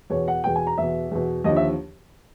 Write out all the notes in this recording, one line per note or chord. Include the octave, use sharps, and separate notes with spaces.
E2 B2 C#5
F#5
E2 B2 G5
G#5
A#5
E2 B2 E5
E2 B2
D#2 D3 F3 D#5
E5